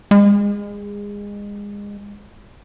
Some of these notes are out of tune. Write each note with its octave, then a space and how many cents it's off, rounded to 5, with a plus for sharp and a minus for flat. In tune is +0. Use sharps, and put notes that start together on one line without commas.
G#3 -25